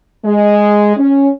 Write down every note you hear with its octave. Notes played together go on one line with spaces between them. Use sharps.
G#3
C#4